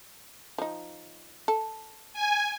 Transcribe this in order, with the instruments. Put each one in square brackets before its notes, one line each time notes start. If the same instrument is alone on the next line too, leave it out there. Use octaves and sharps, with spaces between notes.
[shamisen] F3 D#4
A4
[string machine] G#5